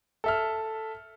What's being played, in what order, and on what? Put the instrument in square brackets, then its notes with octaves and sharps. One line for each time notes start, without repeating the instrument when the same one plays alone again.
[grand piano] A4 E5 F6